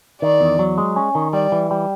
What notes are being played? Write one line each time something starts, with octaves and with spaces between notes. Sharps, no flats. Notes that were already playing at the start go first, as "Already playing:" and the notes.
D#3 D5
E2
F#3
G#3
C#4
D#3
G3 D5
E3
G3